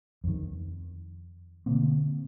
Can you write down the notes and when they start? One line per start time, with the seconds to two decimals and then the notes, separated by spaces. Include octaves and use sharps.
0.24 F2 D#3
1.66 B2 D3 A#3 C4